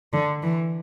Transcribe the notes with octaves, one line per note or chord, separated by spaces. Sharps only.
D3
E3